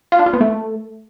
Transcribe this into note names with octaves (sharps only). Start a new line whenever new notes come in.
F4
D4
F4
B3
A3